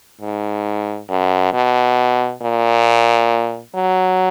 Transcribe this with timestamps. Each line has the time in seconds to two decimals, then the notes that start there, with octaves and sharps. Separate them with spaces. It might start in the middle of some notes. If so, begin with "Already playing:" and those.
0.21 G#2
1.09 F#2
1.54 B2
2.42 A#2
3.75 F#3